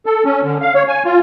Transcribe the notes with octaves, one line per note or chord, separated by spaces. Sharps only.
A4
C#4
D3
F5
C#5
G#5
F4